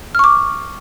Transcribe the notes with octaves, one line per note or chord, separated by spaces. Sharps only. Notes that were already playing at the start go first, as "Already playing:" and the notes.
C#6 D6 F6